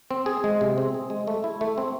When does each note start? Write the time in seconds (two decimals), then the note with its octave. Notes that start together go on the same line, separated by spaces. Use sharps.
0.11 C4
0.26 G#4
0.44 G#3
0.61 C3
0.78 C4
0.94 G#4
1.10 G#3
1.27 A3
1.44 E4
1.61 A3
1.78 C4